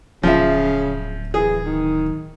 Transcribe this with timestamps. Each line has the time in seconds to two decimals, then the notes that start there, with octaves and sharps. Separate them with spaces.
0.23 D1 C#3 F3 E5
1.34 E3 G#4
1.65 D#3